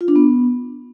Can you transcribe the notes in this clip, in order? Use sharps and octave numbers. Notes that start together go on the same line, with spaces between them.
F4
D4
B3